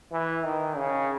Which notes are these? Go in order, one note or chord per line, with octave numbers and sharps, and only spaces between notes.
E3
D#3
C#3